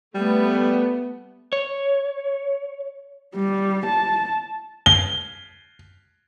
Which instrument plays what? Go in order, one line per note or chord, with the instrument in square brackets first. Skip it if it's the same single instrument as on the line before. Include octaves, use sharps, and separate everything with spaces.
[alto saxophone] G3 [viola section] A3 B3
[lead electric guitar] C#5
[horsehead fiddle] G3
A5
[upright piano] G7